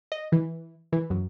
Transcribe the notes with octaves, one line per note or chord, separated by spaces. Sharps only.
D#5
E3
E3
F#2